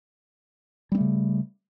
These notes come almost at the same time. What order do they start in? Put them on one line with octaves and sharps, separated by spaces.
G3 C4 A3 C#3